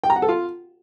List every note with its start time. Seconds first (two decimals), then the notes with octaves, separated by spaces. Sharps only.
0.04 G5
0.10 A#5
0.16 F#5
0.22 A4
0.29 F4